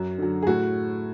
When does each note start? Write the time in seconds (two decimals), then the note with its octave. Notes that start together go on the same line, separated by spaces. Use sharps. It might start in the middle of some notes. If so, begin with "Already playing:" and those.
Already playing: F#2 F#4
0.18 D3 F#3
0.42 G#4
0.47 A2 F#4